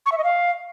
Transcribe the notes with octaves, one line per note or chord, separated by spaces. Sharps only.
C#6
E5
D#5
F5